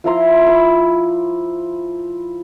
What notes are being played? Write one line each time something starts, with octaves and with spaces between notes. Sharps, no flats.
F3 E4 A#5 C6
B5 D6